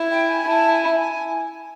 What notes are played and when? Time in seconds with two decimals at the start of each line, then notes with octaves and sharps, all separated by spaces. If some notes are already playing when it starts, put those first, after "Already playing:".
Already playing: E4
0.11 G5
0.30 G#5
0.48 E4 A5
0.73 G#5
0.97 G#5